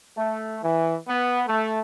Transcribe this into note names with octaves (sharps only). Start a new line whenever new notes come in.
A3
E3
B3
A3